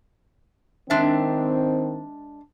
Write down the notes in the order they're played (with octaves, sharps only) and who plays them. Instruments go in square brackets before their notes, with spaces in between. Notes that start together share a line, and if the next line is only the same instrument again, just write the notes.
[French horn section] D#3 C4 [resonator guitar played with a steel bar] G#3 D4 E5